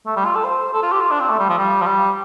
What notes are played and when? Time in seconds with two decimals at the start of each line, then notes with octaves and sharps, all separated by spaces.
0.06 A3
0.16 G3
0.25 F4
0.35 A4
0.44 C5
0.73 A4
0.83 F4
0.92 G4
1.01 F4
1.11 D4
1.20 C4
1.30 A3
1.39 G3
1.49 F3
1.58 G3
1.81 F3
1.87 G3